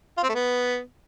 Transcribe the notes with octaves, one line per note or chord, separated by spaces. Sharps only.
F4
C4
A3
B3